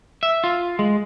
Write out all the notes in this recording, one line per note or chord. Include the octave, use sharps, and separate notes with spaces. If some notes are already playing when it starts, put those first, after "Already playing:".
E5
F4
G#3